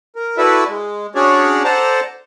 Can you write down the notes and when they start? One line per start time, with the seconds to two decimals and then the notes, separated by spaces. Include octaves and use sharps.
0.16 A#4
0.37 E4 F#4 A4 B4 D5 E5
0.69 G#3
1.15 C#4 D4 F#4 G#4 C#5 D5
1.64 A4 C5 D5 F#5 A5 A#5